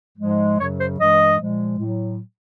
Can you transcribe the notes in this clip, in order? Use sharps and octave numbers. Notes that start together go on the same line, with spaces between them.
G#2 F3 G#3
F#2 C#3 F#3 C#5
C5
G2 E3 G#3 D#5
A#2 F3 G#3
A2 F#3